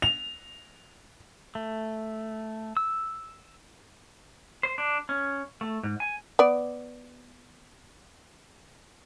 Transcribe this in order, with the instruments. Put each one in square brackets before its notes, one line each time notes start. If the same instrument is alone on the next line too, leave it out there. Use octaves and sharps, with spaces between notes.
[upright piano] F7
[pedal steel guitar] A3
E6
[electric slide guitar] C5
D4
C#4
A3
G#2
G#5
[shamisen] B3 D5